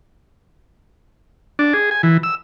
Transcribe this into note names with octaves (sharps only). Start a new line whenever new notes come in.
D4
G#4
G#5
E3
E6